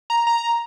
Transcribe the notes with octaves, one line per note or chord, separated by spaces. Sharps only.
A#5
A#5